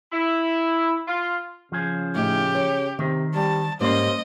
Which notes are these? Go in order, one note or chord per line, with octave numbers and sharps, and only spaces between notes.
E4
F4
C#3 F3 G#4
A2 D#4 G4
C#5
C3 D#3 C4
G3 A5
G#2 G3 A#3 C#4 C5 D#5 C6